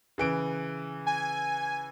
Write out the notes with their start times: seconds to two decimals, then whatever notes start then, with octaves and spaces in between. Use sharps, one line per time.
0.18 C#3 E3 D7
1.06 G#5